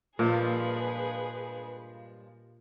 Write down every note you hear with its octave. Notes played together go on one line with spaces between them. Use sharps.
G2 A#2 F3 G#3 G#4 B4